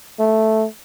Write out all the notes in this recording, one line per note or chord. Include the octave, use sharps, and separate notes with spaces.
A3